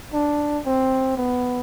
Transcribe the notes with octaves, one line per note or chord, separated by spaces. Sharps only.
D4
C4
B3